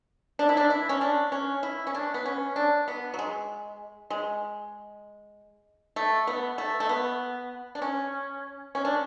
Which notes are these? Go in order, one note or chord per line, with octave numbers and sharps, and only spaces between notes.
D4
E4
D4
E4
C#4
D4
C#4
E4
C#4
D4
B3
C#4
D4
B3
F#3
G#3
G#3
A3
B3
A3
A3
B3
D4
C#4
C#4
D4